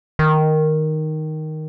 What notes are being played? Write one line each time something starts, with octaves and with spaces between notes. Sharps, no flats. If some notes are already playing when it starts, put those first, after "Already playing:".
D#3